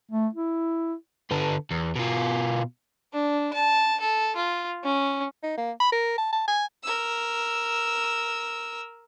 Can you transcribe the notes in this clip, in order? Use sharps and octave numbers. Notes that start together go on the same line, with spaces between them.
A3
E4
D3 B3
E2
B2 F4
D4
A5
A4
F4
C#4
D#4
A#3
B5
A#4
A5
A5
G#5
A#4 E6